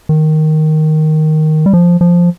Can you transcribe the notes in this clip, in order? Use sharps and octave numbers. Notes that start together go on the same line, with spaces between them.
D#3
G3
F3
F3